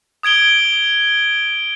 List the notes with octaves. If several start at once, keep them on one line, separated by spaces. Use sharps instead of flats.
D#6 G#6 D7 G7